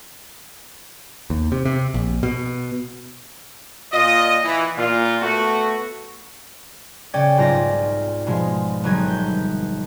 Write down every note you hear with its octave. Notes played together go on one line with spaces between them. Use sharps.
D#2
C3
C3
A#1
B2
A#2 F4 D#5
E3
A#2 F4
A3 B3 F#4
C#3 C#4 D5 G5 G#6
B1 G#2 C4 F4 D5 A#6
B2 F3 G#3
G1 F#3 D#4 G#6
G6